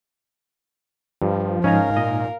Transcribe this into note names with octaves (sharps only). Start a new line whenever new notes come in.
G2 F3
G#2 C#4 D#4 A#4 F5 G#5 A#5
A#2 D#5